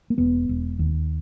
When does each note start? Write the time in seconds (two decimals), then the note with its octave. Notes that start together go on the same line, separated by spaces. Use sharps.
0.10 A#3
0.18 E1 B3
0.49 E1
0.79 D#2